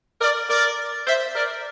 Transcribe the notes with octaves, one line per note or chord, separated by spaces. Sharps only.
A#4 D5
A#4 D5
C5 E5
A#4 D5